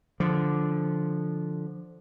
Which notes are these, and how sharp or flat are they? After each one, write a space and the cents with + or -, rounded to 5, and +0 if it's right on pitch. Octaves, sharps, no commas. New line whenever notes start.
D3 +0 F3 +0